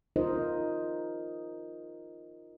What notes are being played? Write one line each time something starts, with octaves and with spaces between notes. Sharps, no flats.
D#4 F4 A#4 C5 D#5